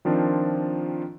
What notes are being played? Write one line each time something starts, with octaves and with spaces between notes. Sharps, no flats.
D#3 F3 C4 D4 F4